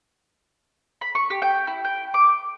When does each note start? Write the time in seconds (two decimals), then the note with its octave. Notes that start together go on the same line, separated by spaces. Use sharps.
1.01 B5
1.15 C#6
1.30 G4
1.42 G5
1.67 E4
1.85 G5
2.14 D6